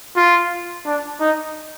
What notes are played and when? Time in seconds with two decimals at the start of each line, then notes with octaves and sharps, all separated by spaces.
0.16 F4
0.86 D4
1.20 D#4